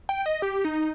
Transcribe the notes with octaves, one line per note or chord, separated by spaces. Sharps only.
G5
D#5
G4
D#4